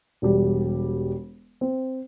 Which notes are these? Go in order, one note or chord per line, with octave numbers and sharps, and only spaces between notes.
E1 G3
C4